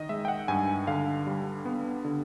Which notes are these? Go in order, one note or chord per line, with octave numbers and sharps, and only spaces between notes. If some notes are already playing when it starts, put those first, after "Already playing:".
Already playing: D#3 D#5
G#3 E5
G5
F#5
G2 G#5
D3 F5
G3
B3
D3